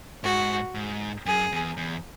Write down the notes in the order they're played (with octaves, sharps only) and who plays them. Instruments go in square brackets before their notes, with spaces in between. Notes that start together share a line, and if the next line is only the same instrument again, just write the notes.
[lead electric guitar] G#2 [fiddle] F#4
[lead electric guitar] G#2
[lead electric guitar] F#2 [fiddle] G#4
[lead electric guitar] E2
E2